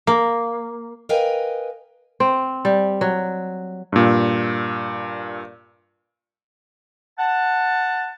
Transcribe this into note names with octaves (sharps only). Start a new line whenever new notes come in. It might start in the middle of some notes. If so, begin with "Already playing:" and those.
A#3
A#4 B4 D#5 F5 G5 G#5
C4
G3
F#3
G2 A#2
F#5 A5